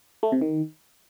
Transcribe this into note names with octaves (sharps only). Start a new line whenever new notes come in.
A3
C3
D#3